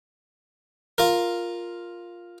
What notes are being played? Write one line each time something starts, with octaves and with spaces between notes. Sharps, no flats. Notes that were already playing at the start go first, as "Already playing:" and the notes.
F4 A#4